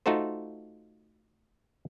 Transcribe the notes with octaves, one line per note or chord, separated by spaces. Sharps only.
A3 D#4 F4 F#4 A4 C5